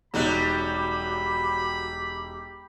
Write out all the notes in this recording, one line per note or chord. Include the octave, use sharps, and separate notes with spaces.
E1 F#3 G3 D#4 G4 B5 F#6